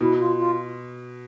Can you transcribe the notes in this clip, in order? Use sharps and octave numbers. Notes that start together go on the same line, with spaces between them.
B2 E4
F4
F4